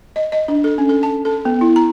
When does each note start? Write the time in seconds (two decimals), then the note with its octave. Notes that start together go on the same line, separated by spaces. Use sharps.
0.16 D#5
0.32 D#5
0.48 D4
0.64 A4
0.78 C#4
0.89 A4
1.03 A5
1.25 A4
1.45 B3
1.61 E4
1.76 A#5